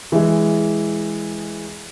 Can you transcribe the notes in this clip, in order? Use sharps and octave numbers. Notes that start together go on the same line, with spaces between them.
E3 G#3